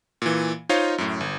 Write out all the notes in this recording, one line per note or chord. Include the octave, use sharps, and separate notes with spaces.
A#2 E3
D#4 F4 C5 C#5 D#5 F5
F#2 A2
G1